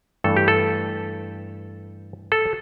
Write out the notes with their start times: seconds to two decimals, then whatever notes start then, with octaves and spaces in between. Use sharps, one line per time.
0.24 G2 E3 A3 A4
0.37 G4
0.48 A4
2.32 A4